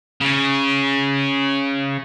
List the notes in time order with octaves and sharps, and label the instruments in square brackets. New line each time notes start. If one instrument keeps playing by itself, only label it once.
[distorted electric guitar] C#3 C#4